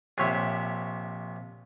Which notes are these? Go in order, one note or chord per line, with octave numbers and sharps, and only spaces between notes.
A#1 C3 C#5 E5